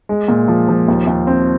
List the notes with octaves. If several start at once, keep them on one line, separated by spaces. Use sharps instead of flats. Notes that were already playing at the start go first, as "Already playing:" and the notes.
G#3
A#2
F3
F3
D#2
D#2
C4